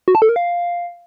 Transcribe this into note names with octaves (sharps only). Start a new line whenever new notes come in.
F#4
A5
A4
A#4
F5